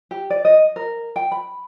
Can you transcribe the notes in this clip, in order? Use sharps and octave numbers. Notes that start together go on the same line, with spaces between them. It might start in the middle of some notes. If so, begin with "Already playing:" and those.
G4
D5
D#5
A#4
G5
B5